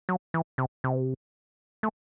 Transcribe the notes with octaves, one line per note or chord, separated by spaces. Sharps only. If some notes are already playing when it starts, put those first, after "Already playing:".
F#3
E3
C3
C3
A3